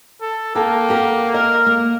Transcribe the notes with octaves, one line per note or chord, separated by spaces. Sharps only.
A4
A#3 A4 G5
B3 G4 A#4
A#4 D#5
A#3